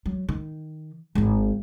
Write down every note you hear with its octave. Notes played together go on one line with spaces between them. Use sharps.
F#3
D#3
G#1 D#4